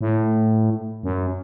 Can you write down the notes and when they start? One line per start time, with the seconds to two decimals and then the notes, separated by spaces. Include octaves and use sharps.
0.01 A2
1.03 F#2